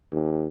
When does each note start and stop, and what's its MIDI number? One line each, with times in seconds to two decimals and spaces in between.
0.12 0.48 39